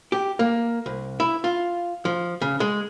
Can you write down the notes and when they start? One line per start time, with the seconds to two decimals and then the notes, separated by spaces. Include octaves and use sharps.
0.12 G4
0.39 A#3
0.86 C2
1.20 E4
1.44 F4
2.05 F3
2.42 C#3
2.60 G#3